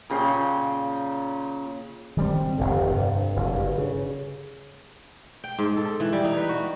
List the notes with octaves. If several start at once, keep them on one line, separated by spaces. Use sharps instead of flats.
A#2 C#3 G5 C6
D#3 G3 C4
F1 B1 D3
G2 C3
F#1
G2
C#3
G5
G#2
A4
E3
G3
D#4
B4
F#4